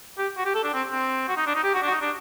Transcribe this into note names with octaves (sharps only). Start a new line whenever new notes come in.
G4
F#4
G4
A4
D4
C4
C4
F#4
D#4
D4
D#4
G4
F#4
D4
F#4
D#4
D4